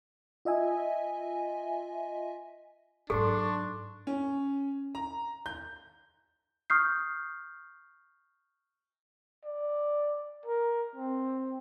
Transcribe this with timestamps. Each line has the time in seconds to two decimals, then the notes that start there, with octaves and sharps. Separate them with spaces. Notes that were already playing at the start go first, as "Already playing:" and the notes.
0.45 F4 D#5 E5 G#5
3.10 G#2 F#3 D4 A4 C6 C#6
4.07 C#4
4.95 A#5
5.46 G6
6.70 C#6 D#6 F6 G6 C7
9.45 D5
10.46 A#4
10.95 C4